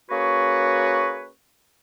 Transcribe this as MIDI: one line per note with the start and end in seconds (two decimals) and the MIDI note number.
0.10 1.29 58
0.10 1.29 61
0.10 1.29 66
0.10 1.29 68
0.10 1.29 71
0.10 1.29 73